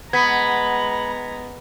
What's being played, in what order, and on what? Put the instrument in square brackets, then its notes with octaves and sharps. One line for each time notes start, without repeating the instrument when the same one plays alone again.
[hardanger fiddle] G#3 A#5 [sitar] B3 [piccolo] B5 [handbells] G#6 B6